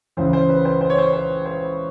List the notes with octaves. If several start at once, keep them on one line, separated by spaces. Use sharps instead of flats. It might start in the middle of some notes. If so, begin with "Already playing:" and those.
C#2 C#3 E3 C5
C5
B4
C5
C5
C#5
C5
C5
C5